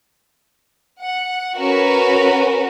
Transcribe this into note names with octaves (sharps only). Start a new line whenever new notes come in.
F#5
C#4 F#4 A#4 B4